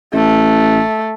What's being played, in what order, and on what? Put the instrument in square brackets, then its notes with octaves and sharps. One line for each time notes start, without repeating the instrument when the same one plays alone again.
[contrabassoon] A1 [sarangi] A3